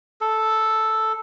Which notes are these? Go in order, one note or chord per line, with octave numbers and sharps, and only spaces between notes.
A4